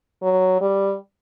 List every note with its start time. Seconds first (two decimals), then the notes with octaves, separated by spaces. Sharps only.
0.22 F#3
0.61 G3